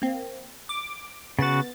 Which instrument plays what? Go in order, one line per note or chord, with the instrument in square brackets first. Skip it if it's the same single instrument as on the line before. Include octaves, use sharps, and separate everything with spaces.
[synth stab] A#3 C4
D6
[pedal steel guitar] C#3 F#4 [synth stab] B3 A6